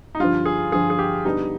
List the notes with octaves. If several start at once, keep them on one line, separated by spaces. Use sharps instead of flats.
D#4
G2 D3 F3 F4
G#4
G2 D3 F3 G#4
G#4
G4
D3 G3 B3 D4 D#4 G4